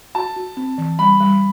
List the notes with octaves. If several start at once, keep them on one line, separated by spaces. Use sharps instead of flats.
F#4 A5
F#4
C4
E3
G3 B5
G3